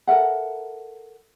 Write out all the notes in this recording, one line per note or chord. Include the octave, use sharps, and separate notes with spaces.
A4 A#4 E5 F#5